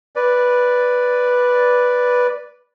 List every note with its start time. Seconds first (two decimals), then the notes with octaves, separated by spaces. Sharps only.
0.16 B4 D5